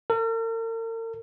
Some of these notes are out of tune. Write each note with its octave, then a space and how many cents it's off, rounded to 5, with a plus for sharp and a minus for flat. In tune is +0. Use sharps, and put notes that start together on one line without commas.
A#4 -45